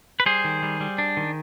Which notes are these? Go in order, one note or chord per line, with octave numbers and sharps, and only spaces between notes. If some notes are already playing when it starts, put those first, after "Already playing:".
B4
G3 G#4 C5
D#3
G3
G3
D4
D#3